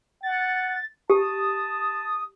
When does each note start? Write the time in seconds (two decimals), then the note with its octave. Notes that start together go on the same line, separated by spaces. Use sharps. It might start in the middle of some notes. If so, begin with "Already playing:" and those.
0.23 F#5 A6
1.10 G4 A5 D#6